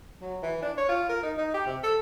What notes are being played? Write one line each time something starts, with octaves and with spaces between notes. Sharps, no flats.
F#3
E3
D4
C#5
F4
A#4
D#4
D#4
G4
C3
A4